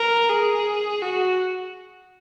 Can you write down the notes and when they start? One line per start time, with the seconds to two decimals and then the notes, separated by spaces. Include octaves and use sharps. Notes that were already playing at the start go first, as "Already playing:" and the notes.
Already playing: A#4
0.29 G#4
1.02 F#4